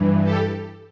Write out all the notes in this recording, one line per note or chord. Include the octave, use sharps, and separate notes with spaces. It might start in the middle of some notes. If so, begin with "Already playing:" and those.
Already playing: G2 E3
G4 A4